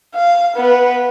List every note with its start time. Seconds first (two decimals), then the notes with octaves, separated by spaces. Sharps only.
0.15 F5
0.56 B3 B4